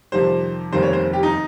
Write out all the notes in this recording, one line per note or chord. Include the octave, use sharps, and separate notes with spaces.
F2 C3 D#3 G3 C5
F1 D#2 D#3 G3 C5
C#5
C5
G4
D#4